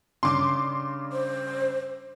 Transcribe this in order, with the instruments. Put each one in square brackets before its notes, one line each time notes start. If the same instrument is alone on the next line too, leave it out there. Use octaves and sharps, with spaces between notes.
[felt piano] G2 C#3 [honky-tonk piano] C6 D6
[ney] C5